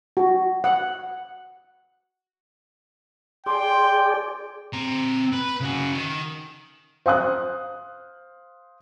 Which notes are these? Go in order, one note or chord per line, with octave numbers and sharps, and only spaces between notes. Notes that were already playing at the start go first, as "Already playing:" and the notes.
F#4
F#5
G#4 D5 G5 C6
C4 A#5
B4
C#3 F#4
D#3
C5 F5 D#6 F#6